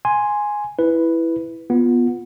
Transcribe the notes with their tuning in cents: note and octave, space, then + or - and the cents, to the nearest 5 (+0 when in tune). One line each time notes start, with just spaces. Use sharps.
G#5 +0 C6 +0
E4 +0 B4 +0
B3 -10 F4 +0